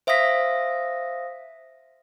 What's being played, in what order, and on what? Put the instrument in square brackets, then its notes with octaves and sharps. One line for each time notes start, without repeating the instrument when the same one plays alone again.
[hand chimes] C5 E5 F5 D#6 A#6 B6